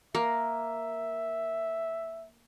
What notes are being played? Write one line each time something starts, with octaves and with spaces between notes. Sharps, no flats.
A#3 E5